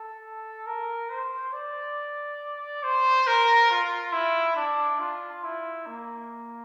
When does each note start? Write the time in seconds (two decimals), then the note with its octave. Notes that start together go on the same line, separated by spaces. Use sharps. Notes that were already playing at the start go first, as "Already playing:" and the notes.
Already playing: A4
0.66 A#4
1.09 C5
1.53 D5
2.84 C5
3.27 A#4
3.70 F4
4.13 E4
4.56 D4
4.99 F4
5.44 E4
5.86 A#3